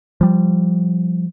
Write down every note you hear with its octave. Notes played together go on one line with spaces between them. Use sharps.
F3 G3